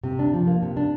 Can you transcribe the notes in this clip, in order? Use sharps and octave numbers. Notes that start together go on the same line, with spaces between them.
C3
D4
F3
A#3
C3
D4